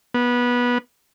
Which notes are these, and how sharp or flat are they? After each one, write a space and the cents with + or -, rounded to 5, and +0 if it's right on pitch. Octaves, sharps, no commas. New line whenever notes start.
B3 -20